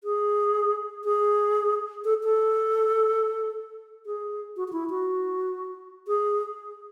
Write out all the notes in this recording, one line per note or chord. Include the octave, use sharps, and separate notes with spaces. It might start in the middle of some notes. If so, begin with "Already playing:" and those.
G#4
G#4
A4
A4
G#4
F#4
F#4
E4
F#4
G#4